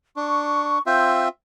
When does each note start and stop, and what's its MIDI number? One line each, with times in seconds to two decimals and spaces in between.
0.16 0.79 62
0.16 0.81 85
0.86 1.28 60
0.86 1.28 65
0.86 1.28 76
0.86 1.22 91